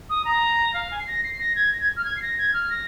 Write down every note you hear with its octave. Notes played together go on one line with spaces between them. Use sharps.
D#6
A#5
F5
G#5
C7
A#6
C7
A#6
G#6
A#6
G#6
F6
G#6
C7
A#6
G#6
F6
A#6